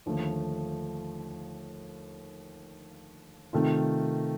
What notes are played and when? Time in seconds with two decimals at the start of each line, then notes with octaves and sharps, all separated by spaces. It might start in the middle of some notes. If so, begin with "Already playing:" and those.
0.06 D#2 D3 F3 A3
3.53 C3 D#3 A3 C4 F4